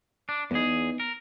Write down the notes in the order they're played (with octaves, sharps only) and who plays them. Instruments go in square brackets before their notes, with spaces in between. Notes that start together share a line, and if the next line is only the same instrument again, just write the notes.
[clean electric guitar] D4
[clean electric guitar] E2 G#4 [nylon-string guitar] B3 D#4
[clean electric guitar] A#4